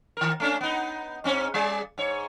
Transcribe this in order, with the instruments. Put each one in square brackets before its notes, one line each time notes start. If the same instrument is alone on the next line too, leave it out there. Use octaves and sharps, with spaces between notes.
[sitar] D#3 A#4
A3 C#4 D4
B3 D#4
G#2 C4 C#4
G3 G#4 D5
G#2 C#5